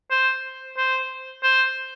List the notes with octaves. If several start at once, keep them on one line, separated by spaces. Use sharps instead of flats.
C5
C5
C5